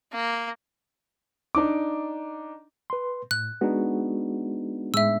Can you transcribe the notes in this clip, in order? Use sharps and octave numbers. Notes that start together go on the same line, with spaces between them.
A#3
D4 D#4 D6
B4 C6
A2 F#6
G#3 B3 D4 D#4 F#4 G#4
A2 G#3 E5 E6